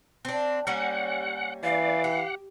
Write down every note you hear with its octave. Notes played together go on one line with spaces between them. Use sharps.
C4 D4
G3 A#3 C#4 F#5
E3 D5 F5
G4 F#5